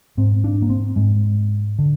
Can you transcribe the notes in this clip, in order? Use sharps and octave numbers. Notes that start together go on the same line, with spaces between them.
G#2 C4
D4
A#3
C4
G#2 G#3
D3